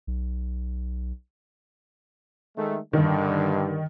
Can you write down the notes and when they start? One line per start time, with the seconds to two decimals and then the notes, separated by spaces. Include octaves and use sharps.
0.07 B1
2.57 D#3 G#3 A3
2.93 G2 D3 D#3